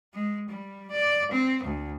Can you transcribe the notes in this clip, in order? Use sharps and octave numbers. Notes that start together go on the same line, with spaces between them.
G#3
G3
D5
C4
D2